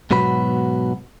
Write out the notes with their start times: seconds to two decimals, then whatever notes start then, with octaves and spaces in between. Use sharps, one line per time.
0.11 G#2 B2 F#3 B3 B5